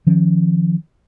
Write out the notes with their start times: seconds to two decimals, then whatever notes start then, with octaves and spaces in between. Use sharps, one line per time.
0.07 D#3 F3 C#4